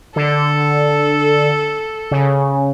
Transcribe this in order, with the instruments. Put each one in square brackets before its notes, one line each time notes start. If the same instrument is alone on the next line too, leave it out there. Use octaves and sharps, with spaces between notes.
[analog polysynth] D3 [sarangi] A4
[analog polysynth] C#3